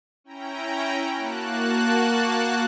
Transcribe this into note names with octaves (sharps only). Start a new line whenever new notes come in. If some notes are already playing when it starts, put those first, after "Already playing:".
C#4 E4 G5 A#5
A#3 F#4 A5 F#6